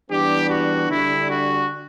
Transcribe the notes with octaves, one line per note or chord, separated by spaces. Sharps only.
E3 G3 B3 D4 G4
F#4
D3 G3 D4 E4
F#4